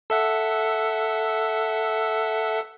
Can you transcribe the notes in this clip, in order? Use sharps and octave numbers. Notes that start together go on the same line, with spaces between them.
A4 E5 F#5